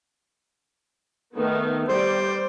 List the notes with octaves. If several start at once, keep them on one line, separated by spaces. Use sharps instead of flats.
D#3 A3 B3
G3 G4 C5 D5